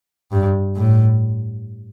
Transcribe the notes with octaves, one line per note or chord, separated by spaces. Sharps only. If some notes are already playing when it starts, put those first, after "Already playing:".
G2
A2